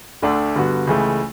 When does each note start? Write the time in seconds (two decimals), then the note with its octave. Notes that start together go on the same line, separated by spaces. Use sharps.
0.22 D2 D3 A3 D4
0.55 G2 D3 G3 B3 F#4
0.87 C#2 C#3 E3 A3